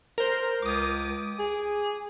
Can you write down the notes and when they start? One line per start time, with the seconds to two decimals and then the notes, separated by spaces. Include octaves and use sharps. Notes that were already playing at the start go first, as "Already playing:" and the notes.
0.18 A#4 C5
0.62 C#2 D6 D#6
1.39 G#4